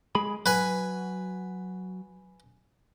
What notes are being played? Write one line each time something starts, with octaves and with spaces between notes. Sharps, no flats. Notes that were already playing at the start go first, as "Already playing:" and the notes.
G#3 G#4 B5
F#3 B4 G#5